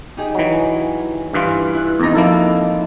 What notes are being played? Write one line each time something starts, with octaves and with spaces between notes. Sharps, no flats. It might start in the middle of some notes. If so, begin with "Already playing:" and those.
D#4 G4 G#4
E3 F#3
G2 E3 F4
E4 F#6
E2 C4 D#4 A#5
F3 A#3 C4 D#4 E4 A4